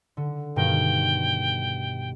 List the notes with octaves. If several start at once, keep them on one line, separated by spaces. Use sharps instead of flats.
D3
G2 B2 D#3 G5